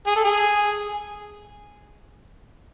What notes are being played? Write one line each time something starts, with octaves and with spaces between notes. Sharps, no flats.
G#4
A4
G#4